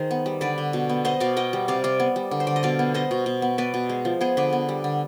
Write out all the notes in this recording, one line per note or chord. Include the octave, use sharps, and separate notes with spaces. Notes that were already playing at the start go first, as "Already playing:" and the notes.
Already playing: D#3 G#4 C5
B3
G3
D3 B4 D5
D3
B2
B3
B3 C5 D#5
B2 D5 F5
B3 D#5 G5
G3
C3 D5 F5
C3 D5 F5
B3
G3
D3
C5
D3 D5
D#5
B2 D5 F5
B3
B3 C5 D#5
B2
B2
B3
B3 B4 D5
B2
G#3
F3
B3 G#4 C5
D3 B4 D5
B3
G3
D3